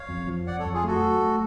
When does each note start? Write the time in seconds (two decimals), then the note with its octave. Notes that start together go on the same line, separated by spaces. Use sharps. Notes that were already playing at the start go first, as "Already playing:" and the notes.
Already playing: C#5 F5
0.09 F2
0.27 F3
0.46 F2 D5 F#5
0.59 A4 C#5
0.65 F2
0.73 F4 G#4
0.83 A3 F#4 A4
1.01 F#3
1.20 A3